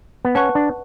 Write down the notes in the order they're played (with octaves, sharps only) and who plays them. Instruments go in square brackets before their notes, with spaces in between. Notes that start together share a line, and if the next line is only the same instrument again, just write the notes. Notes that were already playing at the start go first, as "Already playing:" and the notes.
[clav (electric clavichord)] B3
[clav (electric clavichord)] C#4 [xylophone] B4 F#5 A5 C#6 F#6
[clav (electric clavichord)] D4